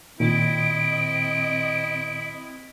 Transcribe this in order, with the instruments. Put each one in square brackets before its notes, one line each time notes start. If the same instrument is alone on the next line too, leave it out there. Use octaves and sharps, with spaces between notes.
[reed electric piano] A#2 D#3 [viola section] C4 D#5 [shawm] E4 [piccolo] D7